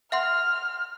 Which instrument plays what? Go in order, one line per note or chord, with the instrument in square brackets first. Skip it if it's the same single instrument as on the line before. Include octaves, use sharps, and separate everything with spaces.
[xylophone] E5 F#5 C6 [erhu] F6